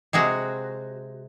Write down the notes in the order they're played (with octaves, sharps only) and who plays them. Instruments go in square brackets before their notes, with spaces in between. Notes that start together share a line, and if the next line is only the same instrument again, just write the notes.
[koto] C3 G#3 C4 F#4